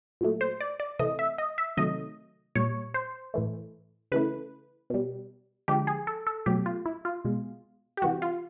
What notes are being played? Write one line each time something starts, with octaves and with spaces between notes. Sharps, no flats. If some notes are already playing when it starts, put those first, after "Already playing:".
A#2 F#3 A3
C5
D5
D5
C3 E3 A3 D#5
E5
D#5
E5
C3 D#3 F#3 A3 D#5
A#2 G3 C#5
C5
A2 E3 A3
C#3 E3 A3 B4
B2 G3
D3 F3 G#3 G4
G#4
A4
A4
B2 F#3 A3 G4
F4
E4
F4
B2 G#3
G4
C3 E3 G3 F#4
F4